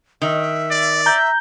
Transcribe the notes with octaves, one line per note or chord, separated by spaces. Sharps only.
D#3 E5
D5
E5 A#5 G6